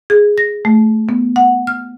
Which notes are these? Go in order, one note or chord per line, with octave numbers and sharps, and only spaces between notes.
G#4
A#6
A3
B3
F#5
F6